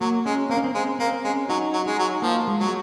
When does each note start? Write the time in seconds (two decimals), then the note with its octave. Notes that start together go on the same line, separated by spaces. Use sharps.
0.01 F#3 A#3
0.26 G#3 C#4
0.49 A#3 C4
0.57 C#4
0.64 C4
0.75 G#3 C4
0.99 A#3 C4
1.24 G#3 C#4
1.49 F#3 D#4
1.73 F#3
1.86 G#3 D#4
1.99 F#3
2.22 F3 A#3
2.48 G#3
2.59 F#3